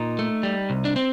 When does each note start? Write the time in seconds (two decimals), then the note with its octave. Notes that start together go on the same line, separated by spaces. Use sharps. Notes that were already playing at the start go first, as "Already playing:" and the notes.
Already playing: A#2 D#4
0.19 A3
0.43 G3
0.70 C2
0.85 D4
0.96 C4